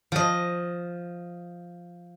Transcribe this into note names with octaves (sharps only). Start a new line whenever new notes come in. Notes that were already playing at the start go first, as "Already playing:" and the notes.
F3 D#5